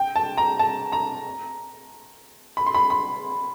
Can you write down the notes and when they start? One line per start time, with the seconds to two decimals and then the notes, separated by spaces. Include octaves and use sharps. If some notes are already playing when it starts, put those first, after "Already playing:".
Already playing: G5
0.16 A5
0.37 A#5
0.59 A5
0.92 A#5
2.57 B5
2.66 C6
2.74 B5
2.90 B5